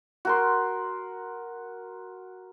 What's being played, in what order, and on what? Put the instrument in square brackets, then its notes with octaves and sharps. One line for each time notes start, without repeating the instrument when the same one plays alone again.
[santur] F#4 A#4 C6